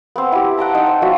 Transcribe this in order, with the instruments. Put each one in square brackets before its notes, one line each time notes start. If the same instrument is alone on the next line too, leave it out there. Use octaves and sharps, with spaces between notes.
[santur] B3 C4
E4 G4
F#5 G5 A5 A#5
D#4
C5
F#3 B3 F4 E5